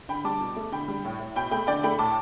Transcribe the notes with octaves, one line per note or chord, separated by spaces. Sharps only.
D3 G5 B5
G3 A5 D6
B2
A3
D3 G5 B5
G3
A2
A2
B2 G5 B5
A3 G5 B5
D3 D5 G5
A3 G5 B5
A2 A5 D6